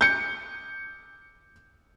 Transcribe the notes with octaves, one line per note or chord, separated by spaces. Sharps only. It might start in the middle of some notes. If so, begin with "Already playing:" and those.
G6 C#7